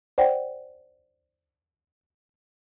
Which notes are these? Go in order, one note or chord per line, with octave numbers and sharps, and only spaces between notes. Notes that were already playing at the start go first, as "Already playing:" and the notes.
C5 D5 F#5 G5